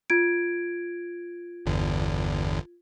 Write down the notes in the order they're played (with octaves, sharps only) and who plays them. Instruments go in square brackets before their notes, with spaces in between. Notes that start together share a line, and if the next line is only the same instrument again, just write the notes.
[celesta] F4 G#6 D7
[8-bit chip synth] G1 E2 D3